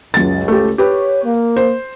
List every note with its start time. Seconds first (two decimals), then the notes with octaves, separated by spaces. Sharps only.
0.14 C#2 F#2 A6
0.48 A3 G4
0.78 G4 B4 C#5
1.24 A#3
1.57 C5